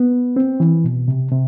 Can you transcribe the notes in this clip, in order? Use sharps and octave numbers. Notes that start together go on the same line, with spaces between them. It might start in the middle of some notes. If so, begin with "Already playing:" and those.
Already playing: B3
C4
E3
B2
C3
C3